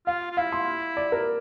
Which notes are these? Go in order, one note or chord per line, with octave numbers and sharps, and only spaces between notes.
F4 F5
F4
E4 F5
C6
D5
A#4